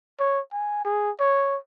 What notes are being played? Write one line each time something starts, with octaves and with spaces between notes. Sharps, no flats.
C#5
G#5
G#4
C#5